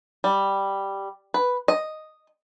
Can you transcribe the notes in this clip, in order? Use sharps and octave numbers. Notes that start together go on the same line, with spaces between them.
G3
B4
D#5